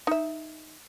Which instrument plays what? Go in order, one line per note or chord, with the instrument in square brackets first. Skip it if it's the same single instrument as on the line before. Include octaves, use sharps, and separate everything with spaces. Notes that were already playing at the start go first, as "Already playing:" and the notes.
[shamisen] D#4 E5